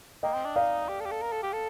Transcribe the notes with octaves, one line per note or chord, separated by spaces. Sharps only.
A#3 D#5 G5
C4
D4
D#4 D5 F5
G4
A4
G4
A4
A#4
A4
G4
A4